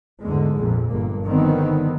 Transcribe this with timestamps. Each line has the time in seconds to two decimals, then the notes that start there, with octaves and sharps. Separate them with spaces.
0.22 E2 G#2 D3 G#3
0.59 A#1 F2 A#2
0.90 G1 G2 A#3
1.26 D3 D#3 F3 G3 B3 C4